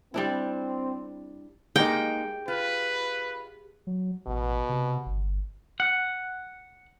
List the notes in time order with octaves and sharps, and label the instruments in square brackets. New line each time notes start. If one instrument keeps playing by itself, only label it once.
[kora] G3 D4 E4 [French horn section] C4
[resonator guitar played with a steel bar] G#3 A#3 D#4 [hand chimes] G4 G#4 [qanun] G5
[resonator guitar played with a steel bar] F4 [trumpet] B4
[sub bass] F#3
[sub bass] A1 [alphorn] B2
[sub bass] C3
G1
[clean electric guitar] F#5